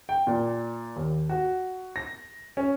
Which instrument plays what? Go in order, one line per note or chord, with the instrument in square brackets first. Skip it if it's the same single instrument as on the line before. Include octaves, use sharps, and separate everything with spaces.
[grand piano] G5
A#2
D#2
F#4
A#6
C#4